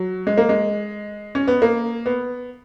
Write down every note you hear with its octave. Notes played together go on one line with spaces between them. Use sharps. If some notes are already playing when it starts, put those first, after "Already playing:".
Already playing: F#3
G#3
A#3
G#3
C#4
B3
A#3
B3